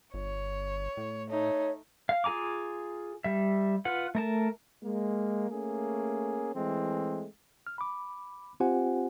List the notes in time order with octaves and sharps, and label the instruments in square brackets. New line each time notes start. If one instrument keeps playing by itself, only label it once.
[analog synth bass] G1 [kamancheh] C#5
[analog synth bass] A2
[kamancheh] A3 D#4 [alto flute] C#5
[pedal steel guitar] F5
F4 G#4 G#5 A#5 D6
G3 E5
F4 B4 F#5
A3 A#4 A5
[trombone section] G#3 A#3
A3 A#3 C#4 G#4
E3 G#3 A3 C4
[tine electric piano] F6
B5 D6
C4 F4 G4 C5 F#5 G#5